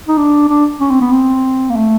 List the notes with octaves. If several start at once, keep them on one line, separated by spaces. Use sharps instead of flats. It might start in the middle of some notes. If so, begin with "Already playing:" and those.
D#4
D4
D4
C#4
C4
B3
C4
A#3
A3